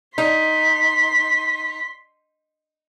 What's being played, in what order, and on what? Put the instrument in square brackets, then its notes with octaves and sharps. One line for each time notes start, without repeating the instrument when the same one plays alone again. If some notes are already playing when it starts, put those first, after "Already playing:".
[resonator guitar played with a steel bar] D#4 [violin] C6 B6